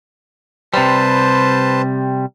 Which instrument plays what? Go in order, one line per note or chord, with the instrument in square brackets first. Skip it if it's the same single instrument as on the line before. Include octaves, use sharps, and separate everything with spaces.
[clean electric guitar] C3 G3 [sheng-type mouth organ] B4 C5 A5